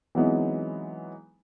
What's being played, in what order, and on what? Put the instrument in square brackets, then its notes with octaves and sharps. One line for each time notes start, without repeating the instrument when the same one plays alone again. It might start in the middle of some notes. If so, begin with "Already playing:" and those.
[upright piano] E3 F#3 G#3 B3 C4 D#4